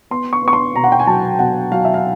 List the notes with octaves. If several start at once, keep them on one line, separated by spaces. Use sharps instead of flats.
B3 C6
C#6
B3 C#6
C6
B2 A#5
F#5
G5
G#5
F#3 A5
B2 F#5
F#3 F5
E5
F5